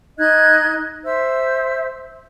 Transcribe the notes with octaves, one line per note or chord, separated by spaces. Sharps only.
D#4 D#5 F#6 G#6
C5 E5 E6